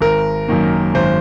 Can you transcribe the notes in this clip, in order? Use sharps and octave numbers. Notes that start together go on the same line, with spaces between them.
G#1 A#4
F#2 D#3 A#3
G#1 C5